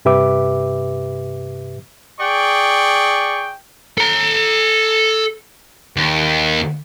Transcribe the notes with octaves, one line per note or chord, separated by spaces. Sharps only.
G2 C3 G4 B4 E5 D6
G#4 D5 G5 C#6
A4 A#5
D#2